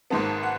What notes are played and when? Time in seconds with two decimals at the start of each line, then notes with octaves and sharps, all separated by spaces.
0.10 G#1 G#2 D#3 G#3 B3 A5
0.43 F#5